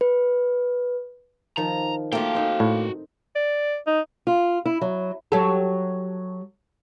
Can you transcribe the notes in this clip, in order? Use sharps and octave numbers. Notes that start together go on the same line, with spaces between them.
B4
D#3 F3 A#5
A3 A#3 F4 F#4 G5
C4 D#4 A#4
A2
D5
D#4
F4
E4
F#3
F#3 G4 A4